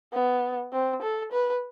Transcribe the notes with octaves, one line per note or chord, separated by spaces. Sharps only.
B3
C4
A4
B4